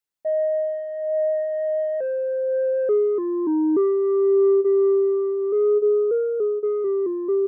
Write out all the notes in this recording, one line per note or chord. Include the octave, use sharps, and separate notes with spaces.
D#5
C5
G#4
F4
D#4
G4
G4
G#4
G#4
A#4
G#4
G#4
G4
F4
G4